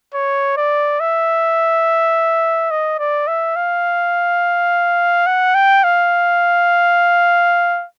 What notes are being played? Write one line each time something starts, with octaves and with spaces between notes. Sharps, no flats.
C#5
D5
E5
D#5
D5
E5
F5
F#5
G5
F5